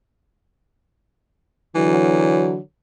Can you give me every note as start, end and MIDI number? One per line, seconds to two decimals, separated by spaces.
1.75 2.57 50
1.75 2.58 52
1.75 2.57 54